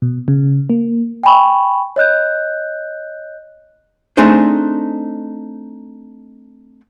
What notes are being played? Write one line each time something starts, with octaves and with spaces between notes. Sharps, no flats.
B2
C#3
A#3
G5 G#5 B5 C#6
C#5 D#5 F#6 G6
A3 C4 D4 D#4 G#4 C5